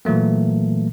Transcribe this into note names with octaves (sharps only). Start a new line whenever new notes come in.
A#2 E3 F#3 A3 A#3